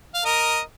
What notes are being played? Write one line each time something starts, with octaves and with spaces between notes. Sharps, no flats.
F5
A#4 D#5